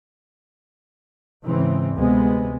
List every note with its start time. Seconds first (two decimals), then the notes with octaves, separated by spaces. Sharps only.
1.44 G#2 C#3 E3 C4
1.95 D2 C3 G#3 B3